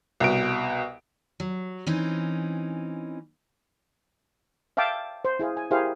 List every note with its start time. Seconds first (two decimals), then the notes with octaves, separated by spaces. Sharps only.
0.20 C2 B2 D7
1.40 F#3
1.87 E3 C4 C#4 D#4
4.77 E5 F5 G5 A5 D6
5.25 C5
5.39 E4 G#4 C5 F5
5.57 G#5
5.71 E4 G4 G#4 A#4 C5 F5